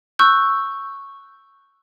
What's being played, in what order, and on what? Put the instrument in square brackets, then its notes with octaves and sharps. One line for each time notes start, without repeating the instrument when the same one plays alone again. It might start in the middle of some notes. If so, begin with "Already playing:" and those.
[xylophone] C#6 E6 F#6 G6